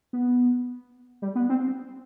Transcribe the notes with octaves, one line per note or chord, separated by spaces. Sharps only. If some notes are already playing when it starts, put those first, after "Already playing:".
B3
G3
B3
C4